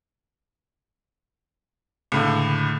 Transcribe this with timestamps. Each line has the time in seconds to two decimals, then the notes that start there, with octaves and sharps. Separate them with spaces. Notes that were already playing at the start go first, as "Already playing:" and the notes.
2.12 C#2 A2 D3